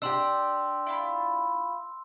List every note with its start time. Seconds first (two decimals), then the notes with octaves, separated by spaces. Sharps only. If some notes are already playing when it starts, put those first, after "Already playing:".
0.02 D4 G4 C6 E6
0.86 E4 F4 B5